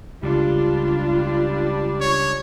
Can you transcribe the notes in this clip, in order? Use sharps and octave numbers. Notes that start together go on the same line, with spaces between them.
C#2 C#3 G3 D4 F4
C#5